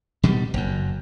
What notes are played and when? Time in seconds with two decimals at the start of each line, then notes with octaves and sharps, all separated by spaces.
0.23 B2 D#3 G3
0.54 F#1 F#2